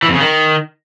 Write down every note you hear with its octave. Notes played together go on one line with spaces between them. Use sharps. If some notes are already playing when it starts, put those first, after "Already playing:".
E3
F2
C#3
D#3